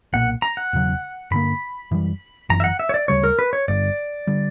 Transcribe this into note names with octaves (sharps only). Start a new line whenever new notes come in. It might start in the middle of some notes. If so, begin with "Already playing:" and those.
B1 A#2 A#3 F#5
A#5
F#5
E1 E2 C#3 F#3
G2 D3 A#3 B5
F#2 E3 G3
G1 F#2 E3 A#5
E5
F#5
E5
C#5
D5
D2 C#3 G3 C#5
A#4
B4
C#5
G1 G2 D3 D5
D3 G3